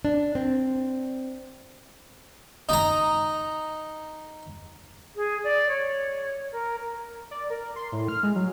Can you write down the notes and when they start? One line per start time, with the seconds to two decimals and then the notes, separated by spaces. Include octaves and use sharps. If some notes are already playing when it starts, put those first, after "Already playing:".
0.05 D4
0.35 C4
2.69 D#4 A#5
5.16 G#4
5.44 D5
5.68 C#5
6.52 A#4
7.31 D5
7.50 A#4
7.76 C6
7.92 A2
8.08 F6
8.23 G#3
8.35 F#3